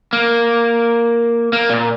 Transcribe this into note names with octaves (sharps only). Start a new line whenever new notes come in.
A#3
A#3
A#2